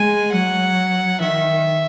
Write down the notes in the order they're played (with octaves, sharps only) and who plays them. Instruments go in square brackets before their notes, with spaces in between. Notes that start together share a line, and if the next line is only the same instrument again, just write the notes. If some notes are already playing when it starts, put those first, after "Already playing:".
Already playing: [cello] G#3 [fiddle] G#5
[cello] F#3 [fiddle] F#5
[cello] D#3 [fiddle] E5